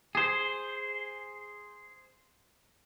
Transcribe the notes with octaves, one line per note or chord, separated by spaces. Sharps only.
G#4 C5